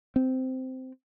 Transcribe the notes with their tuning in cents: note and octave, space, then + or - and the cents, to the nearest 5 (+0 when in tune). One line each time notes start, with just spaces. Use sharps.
C4 -10